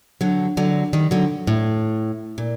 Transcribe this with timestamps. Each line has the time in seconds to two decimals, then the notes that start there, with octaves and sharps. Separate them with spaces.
0.21 D3 F#3
0.57 D3 F#3
0.93 D#3 G3
1.11 D3 F#3
1.47 A2
2.38 A#2